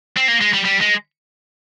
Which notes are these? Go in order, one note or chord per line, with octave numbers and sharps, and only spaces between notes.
C4
A#3
G#3
G3
G3
G#3